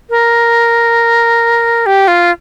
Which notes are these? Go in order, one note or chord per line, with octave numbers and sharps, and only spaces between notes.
A#4
G4
F4